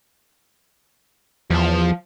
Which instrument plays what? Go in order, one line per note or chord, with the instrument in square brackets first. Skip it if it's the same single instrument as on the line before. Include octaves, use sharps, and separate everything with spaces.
[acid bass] E2 [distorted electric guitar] F3 A5